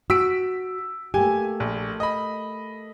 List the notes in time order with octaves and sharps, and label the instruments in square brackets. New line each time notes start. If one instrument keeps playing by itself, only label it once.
[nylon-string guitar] F#4 [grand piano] E6 B6 D7
[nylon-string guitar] A3 A#3 G4 [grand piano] G#5
[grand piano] A#1
D#5 B5